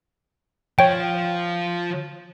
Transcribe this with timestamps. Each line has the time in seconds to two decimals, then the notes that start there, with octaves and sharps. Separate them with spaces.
0.79 F3 C#5 G5